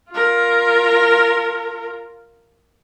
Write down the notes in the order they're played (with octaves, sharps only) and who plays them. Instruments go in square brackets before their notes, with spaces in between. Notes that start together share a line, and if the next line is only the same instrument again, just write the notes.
[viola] F4 A#4